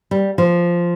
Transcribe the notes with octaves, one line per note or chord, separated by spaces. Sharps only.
G3
F3